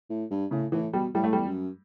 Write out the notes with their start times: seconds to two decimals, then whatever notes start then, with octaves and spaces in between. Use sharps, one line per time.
0.10 A2
0.31 G2
0.51 A2 C#3
0.72 A2 E3
0.93 B2 G3
1.14 A2 G3
1.24 A3
1.33 E2 G3
1.47 F#2